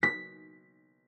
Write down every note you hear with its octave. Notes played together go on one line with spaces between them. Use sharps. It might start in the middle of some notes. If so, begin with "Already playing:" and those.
B6